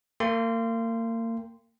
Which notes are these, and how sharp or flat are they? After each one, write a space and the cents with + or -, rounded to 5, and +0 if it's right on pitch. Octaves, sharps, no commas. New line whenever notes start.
A#3 -35 G5 +0 C6 -15